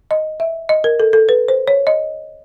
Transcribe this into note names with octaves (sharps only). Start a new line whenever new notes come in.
D#5
E5
D#5
A#4
A4
A4
B4
C5
C#5
D#5